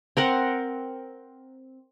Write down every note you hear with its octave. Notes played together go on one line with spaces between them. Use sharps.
C4 A#4 F#5